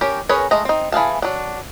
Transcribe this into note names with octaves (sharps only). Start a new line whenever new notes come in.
C#4 G4 A#4
C#4 G#4 A#4 B4 C#5
G#3 A3 D#5 A#5
C4 D#4
E3 G#4 F5 A5
F#3 D4